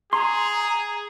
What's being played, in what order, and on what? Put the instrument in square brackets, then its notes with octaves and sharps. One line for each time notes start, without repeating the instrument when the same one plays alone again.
[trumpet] G#4 [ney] A#5 [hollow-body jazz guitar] C6